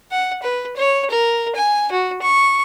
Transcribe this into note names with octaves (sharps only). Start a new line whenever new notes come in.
F#5
B4
C#5
A#4
G#5
F#4
C#6